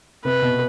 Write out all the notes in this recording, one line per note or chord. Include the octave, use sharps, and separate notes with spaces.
C3 B4
B2